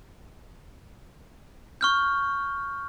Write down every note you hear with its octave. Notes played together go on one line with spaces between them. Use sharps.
C#6 F6 G6